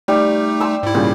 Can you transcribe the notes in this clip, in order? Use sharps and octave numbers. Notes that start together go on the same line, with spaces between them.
G3 A3 D#4
C6 E6
G#2 E4
A#2 C#3 G3 G5